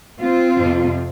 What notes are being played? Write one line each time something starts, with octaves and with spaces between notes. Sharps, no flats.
C4 F4
F2 C3